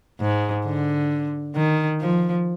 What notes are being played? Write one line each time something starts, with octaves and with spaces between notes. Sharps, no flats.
G#2
D3
D#3
F3